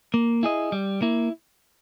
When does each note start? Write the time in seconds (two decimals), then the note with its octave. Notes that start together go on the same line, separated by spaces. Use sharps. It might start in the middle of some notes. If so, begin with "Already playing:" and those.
0.14 A#3
0.43 E4 G#4 D#5
0.72 G3
1.02 A#3 E4